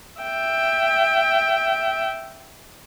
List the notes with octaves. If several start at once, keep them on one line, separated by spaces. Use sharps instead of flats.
E5 G5